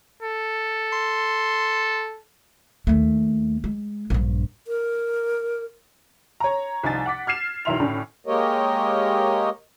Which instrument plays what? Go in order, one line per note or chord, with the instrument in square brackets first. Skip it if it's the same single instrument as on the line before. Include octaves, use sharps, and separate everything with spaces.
[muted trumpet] A4
[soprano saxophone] C6
[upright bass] D#2 A3
G#3
A#1 G2
[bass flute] A#4
[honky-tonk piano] C#5 A#5
C2 F3 D#4 G#5 A6
F#5 D6 B6
F6 G#6 C7 E7
B1 D#3 E3 E5 C6 F7
A2 D3 C#4 D4
[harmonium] G#3 A#3 G4 A#4 C#5 D#5